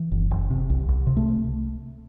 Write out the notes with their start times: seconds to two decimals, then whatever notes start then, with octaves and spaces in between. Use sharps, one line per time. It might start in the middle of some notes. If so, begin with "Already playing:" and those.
Already playing: E3
0.12 F#1
0.31 F#1
0.50 C3
0.70 C2
0.88 C2
1.07 C3
1.17 A3